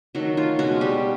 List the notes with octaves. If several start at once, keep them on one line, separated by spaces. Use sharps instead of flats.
D#3 F#3 A3 F#4
F4
B2 G#3 C#4 F4 F#4
G3 G4